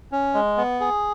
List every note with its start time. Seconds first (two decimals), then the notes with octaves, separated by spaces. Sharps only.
0.12 C#4
0.34 G#3
0.57 B3
0.80 G#4